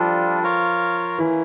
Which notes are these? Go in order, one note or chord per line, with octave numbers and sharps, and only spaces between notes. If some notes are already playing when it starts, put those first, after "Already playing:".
Already playing: F3 G3 D4 F4 A4
F4 A#4 C#5 F5
E3 A#3 C#4 E4